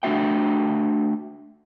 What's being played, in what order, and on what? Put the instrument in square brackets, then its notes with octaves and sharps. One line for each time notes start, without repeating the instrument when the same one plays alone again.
[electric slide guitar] A3 D4 F#4 E5 G5